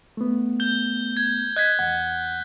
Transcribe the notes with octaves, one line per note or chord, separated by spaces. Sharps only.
A3 B3
G6 G7
G#6
D#5 F#6 G#6 B6
E2 F#5